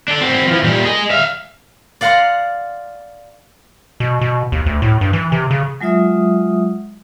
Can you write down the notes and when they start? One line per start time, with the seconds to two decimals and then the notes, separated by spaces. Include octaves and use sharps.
0.08 D4 A4
0.21 C4 F#4
0.47 E3 F3
0.64 A#2 G3
0.84 G#4 D#5
1.11 E5 F5
2.01 D5 F5 F#5 A#5 C6
4.00 B2
4.21 B2
4.52 D#2
4.66 D2
4.82 A2
5.01 G2
5.13 E3
5.32 C3
5.51 C#3
5.81 F#3 G#3 F4 E5 D#6